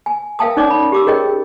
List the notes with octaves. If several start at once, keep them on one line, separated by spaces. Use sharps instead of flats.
G#5
A#4 E5 F5 G5 A5 D#6
C#4 D#4 C#5 D5 D6
B5
G4 D6 E6
G#4 A#4 C#5 D#5 G5